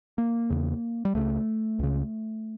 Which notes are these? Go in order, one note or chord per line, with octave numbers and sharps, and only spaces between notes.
A#3
E2 C#3
G3
C#2 C#3 A3
C#2 C#3